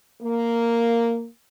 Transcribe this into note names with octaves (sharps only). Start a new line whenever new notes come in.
A#3